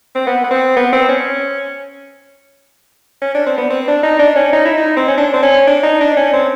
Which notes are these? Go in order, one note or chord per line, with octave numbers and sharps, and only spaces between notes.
C4
B3
B3
C4
B3
C4
C#4
C#4
D4
C4
B3
C4
D4
D#4
D4
C#4
D#4
E4
D#4
C4
C#4
D4
C4
C#4
D4
D#4
D4
C#4
C4